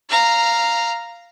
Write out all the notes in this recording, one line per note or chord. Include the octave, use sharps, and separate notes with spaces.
F5 A#5